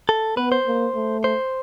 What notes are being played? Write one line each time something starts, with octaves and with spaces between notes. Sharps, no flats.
A4
B3 B4
C5
A#3
A3
C5